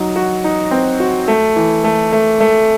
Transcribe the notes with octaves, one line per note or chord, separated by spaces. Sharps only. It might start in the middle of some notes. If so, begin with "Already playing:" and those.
Already playing: F#3 D#4
F#4
D#4
C4
F#4
A3
E3
A3
A3
A3